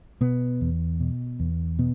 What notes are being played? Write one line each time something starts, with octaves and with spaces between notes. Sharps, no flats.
B2 B3
E2
B2
E2
B2 B3